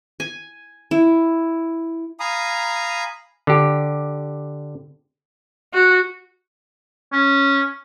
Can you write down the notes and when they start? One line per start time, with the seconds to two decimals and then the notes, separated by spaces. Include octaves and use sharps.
0.20 G#5
0.91 E4
2.20 F5 G#5 A#5 B5 D#6
3.47 D3 G4
5.74 F#4
7.13 C#4